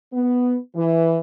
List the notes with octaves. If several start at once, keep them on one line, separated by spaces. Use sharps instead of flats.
B3
E3